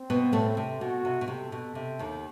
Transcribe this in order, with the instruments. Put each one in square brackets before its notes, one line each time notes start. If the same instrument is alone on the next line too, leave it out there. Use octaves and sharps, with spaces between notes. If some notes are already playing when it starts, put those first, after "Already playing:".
Already playing: [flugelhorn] C4
[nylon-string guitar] B2 B3
A2 A3
C3
[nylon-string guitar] B2 [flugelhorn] F#4
[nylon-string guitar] C3
B2
[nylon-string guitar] C3 [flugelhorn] A4
[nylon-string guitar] B2
C3
D#2 D#3